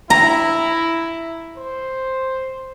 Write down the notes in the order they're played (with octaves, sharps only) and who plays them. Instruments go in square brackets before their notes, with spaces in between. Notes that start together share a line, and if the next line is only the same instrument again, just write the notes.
[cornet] E4 [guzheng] A#5
[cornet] C5